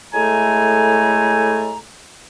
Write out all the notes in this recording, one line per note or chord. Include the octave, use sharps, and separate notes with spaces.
A2 G#3 A3 A4 G#5 A#5